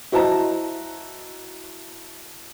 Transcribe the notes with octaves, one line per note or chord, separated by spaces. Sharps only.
E4 F#4 C5 D#5 A5 A#5